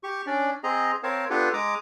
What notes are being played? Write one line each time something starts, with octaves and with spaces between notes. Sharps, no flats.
G4 C#6
C#4 D4 D5
C4 G#4 D#5 A#5
C4 A#4 C#5 F5 A5
B3 D4 F4 G4 A4 B4
G#3 A#5 D6 D#6